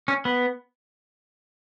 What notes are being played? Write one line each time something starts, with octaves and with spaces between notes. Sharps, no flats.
C#4
B3